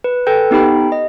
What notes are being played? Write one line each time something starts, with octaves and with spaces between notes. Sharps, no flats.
B4
A4 B4 G5 G6
B3 D#4 G4 G5 B5
D#5